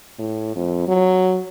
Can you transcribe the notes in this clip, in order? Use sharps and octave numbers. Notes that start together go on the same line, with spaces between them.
A2
F2
F#3